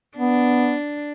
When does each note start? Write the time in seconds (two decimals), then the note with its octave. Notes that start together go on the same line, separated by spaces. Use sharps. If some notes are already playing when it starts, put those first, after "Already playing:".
0.18 B3 D4